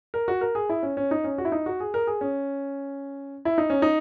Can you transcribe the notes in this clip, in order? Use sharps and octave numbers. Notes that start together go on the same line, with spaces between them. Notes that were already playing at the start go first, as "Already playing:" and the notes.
A#4
F#4
A#4
G#4
E4
C#4
C#4
D#4
C#4
F#4
E4
D#4
F#4
G#4
A#4
G#4
C#4
E4
D#4
C#4
D#4